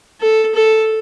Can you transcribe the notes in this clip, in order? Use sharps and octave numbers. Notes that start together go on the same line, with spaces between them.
A4
A4